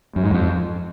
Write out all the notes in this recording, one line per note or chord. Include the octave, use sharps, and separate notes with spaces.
F#2
G#2
F2